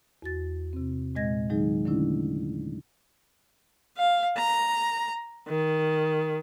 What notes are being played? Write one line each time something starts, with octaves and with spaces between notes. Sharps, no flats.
E2 F#4 A6
C3 C4
A#2 G#3 D#5 G#6 A#6
D#3 F#3 G#3 D#4 G#4
D3 F#3 A3 C#4 D4 E4
F5
A#5
D#3